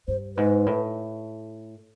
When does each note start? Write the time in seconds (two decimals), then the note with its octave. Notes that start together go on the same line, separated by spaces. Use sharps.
0.08 G2 C5
0.36 G#2 B4
0.66 A2